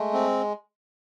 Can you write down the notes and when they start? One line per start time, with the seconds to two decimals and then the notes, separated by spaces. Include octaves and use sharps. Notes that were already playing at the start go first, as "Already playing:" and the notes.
Already playing: G#3 A3
0.13 C4